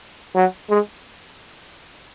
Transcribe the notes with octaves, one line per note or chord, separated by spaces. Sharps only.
F#3
G#3